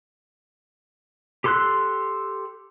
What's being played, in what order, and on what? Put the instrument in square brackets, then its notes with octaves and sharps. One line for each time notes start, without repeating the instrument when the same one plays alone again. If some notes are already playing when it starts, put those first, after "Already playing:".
[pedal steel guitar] G4 A4 C6 E6 F#6